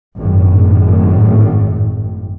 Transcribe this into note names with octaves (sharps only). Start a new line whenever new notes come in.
G#1 F#2 A2